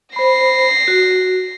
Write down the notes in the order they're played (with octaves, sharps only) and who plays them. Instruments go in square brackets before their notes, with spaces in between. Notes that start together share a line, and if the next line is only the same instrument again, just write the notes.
[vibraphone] C5 B5 [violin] A#6 C7
[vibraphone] F#4